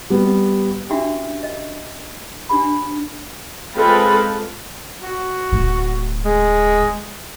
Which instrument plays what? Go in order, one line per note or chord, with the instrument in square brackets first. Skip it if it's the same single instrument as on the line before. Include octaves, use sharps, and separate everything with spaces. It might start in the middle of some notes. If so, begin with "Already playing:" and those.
[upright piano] G3 B3
[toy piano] C#4 D4 E4 F#4 G4 E5
D#5
D4 G4 B5
[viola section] G#3 C4 F4 A4 B4 F5
[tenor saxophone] F#4
[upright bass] D1 A2
[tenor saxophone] G#3